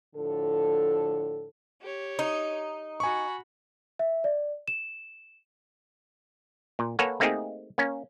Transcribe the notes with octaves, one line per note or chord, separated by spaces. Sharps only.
A2 D3 F3 A4
G4 C#5
D#4
F#4 G#5 B5 C#6
E5
D5
E7
A#2
A#3 A4 B4 C#5 F#5 G#5
A3 A#3 C4 D#4 G4 G#4
A#3 C#4